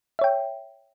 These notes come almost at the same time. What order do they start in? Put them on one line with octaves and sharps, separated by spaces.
E5 C#5 G5